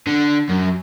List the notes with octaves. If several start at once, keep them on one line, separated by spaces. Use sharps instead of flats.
D3
F#2